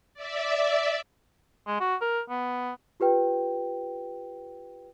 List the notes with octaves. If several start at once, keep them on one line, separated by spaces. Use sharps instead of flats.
D5 E5
G#3
F#4
A#4
B3
F4 G4 B4 G5